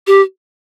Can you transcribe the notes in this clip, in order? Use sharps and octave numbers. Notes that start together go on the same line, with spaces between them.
G4